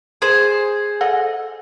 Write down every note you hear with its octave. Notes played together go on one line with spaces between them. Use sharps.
G#4 C5
A4 D#5 F#5